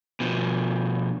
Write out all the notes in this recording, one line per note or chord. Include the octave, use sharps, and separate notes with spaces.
B2 F3